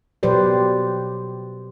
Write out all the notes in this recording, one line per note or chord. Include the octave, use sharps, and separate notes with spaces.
B2 F#3 G4 B4 C5 D5